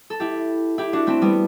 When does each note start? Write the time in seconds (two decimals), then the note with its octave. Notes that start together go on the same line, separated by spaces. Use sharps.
0.10 A4
0.20 E4 G4
0.78 E4 G4
0.93 D4 F#4
1.07 A3 C4
1.22 G3 B3